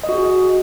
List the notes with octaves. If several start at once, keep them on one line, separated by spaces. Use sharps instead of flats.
D#5
F#4
G#4